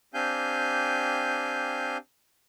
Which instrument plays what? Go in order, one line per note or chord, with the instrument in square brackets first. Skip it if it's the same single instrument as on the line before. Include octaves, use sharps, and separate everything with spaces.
[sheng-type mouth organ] C4 D4 G4 F5 G#5 G6